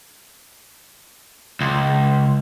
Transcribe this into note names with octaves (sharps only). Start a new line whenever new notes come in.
C#2